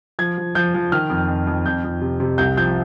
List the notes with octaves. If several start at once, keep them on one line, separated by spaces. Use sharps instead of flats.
F3 G#6
F3
F3 G6
F3
D#3 F6
F2
F2
F2
F2 G6
F2
C3
C3
C2 G6
F3 G6